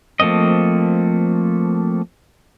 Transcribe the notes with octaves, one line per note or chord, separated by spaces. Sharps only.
F3 A3 A#3 C4 D#5